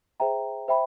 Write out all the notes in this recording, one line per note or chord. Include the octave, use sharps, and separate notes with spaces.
G#4 C5 E5 G5 A#5
C5 E5 G5 B5